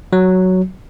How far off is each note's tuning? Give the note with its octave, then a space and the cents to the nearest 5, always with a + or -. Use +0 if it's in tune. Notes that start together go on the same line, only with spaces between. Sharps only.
F#3 +5